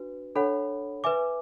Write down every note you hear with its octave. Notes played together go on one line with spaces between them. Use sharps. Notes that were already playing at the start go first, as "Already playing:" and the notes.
Already playing: D4 F#4 B4
D4 A4 C#5 F#5 B5
B4 E5 G#5 D6